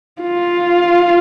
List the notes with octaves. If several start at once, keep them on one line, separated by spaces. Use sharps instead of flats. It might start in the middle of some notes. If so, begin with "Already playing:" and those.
F4